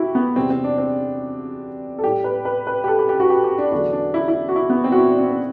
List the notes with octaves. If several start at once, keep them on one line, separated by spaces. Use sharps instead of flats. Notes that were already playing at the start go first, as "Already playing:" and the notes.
Already playing: D2 C3 E4 F#4 G4
B3
E2 C3 G3 C4
C4
D4
C4
A4
A2 G3 G4
B4
B4
B4
G4
A4
G4
G4
F#4
G4
G4
D4
E2 D3 F#3 D4
D4
E4
E4
F#4
E4
B3
C4
F#4
E4
D4
C4
C4